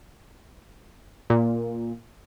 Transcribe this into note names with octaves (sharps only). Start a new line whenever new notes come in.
A#2